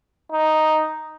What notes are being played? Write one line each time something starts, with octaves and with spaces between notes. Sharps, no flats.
D#4